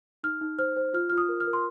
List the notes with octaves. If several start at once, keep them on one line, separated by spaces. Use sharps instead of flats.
D#4 F6
D#4
C5 F6
C5
F4 F6
F6
F4
D#6
A#4
F6
A#4
C6